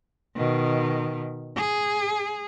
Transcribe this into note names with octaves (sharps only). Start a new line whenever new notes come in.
B2 D#3
G#4